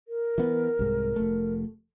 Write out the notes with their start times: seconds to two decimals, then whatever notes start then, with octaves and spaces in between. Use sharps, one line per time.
0.08 A#4
0.38 E3 B3
0.79 C2 G#2
1.16 F1 A3